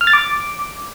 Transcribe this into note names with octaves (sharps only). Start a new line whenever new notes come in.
F6
A6
D6